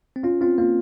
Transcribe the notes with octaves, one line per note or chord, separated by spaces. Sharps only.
C4
C#4 F4
C4 F4
A#3 F4